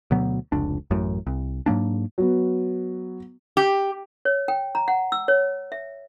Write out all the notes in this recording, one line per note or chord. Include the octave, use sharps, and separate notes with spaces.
D2 B2 F#3 B3
F1 C#2 D4
A1 F#2 A2
C2
G#2 F#3 A#3 D4
F#3 B3
G4
C#5
G5
A#5
F#5
E6
C#5
E5